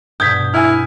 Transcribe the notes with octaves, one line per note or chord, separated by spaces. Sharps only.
G2 B2 D#6 G6 G#6 B6
E4 E5 G#5 E6 F6